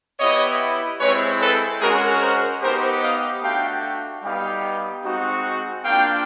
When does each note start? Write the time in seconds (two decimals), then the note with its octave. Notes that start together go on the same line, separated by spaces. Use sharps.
0.19 B3 E4 G4 C#5 D#5
1.00 G#3 C4 E4 B4 C#5
1.40 A4 B4
1.81 G#3 C#4 F#4 G#4 A#4
2.21 A#4 C5
2.62 B3 D#4 G4 A#4 C5
3.02 D#5 F5
3.42 A3 D4 F#4 F5 G5
4.23 G3 B3 D#4 G4 F5 G5
5.04 G#3 C4 D#4 F#4
5.85 A#3 D4 F4 F5 G5